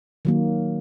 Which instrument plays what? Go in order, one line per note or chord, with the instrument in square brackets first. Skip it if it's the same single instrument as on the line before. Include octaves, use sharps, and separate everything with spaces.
[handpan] D#3 F#3 A#3